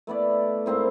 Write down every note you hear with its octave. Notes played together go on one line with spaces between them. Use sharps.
A3 B3 E4 D5
G#2 A#3 C4 E4